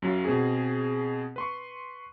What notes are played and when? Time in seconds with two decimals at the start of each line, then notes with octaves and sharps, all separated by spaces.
0.02 F#2 F#3 F4
0.25 B2 C4 G#4
1.36 B4 C6 C#6